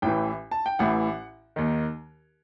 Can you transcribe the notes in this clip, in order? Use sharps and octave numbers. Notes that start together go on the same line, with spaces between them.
A1 A2 E3 G5
A5
G5
A1 A2 E3 F#5
D#2 D#3